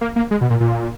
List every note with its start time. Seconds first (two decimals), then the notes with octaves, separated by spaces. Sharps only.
0.01 A#3
0.16 A#3
0.31 G#3
0.41 B2
0.50 A#2
0.60 A#2